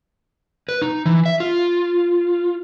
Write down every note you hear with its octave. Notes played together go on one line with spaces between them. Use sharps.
B4
D#4
E3
E5
F4